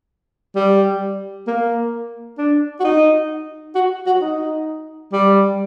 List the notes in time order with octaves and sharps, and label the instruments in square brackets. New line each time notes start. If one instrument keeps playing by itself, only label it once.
[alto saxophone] G3
A#3
D4
F#4
D#4
F#4
F#4
D#4
G3